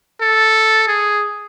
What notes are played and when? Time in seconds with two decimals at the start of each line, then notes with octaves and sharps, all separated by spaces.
0.21 A4
0.88 G#4